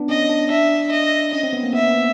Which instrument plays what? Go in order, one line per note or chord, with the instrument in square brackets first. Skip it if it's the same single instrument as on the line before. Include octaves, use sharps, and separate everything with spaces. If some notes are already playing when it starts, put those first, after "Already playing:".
Already playing: [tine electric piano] B3 D4
[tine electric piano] C#4 [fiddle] D#5
[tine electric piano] D4
[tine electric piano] D4 [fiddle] E5
[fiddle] D#5
[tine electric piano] C#4 [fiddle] D#5
[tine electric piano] C4
B3
A#3
[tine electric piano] B3 [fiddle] E5